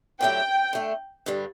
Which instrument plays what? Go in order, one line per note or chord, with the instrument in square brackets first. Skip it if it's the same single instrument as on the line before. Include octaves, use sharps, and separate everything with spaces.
[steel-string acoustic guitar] D3 F#3 A3 E4 G4 [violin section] G5
[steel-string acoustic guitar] D3 A3 D4
G2 D3 G3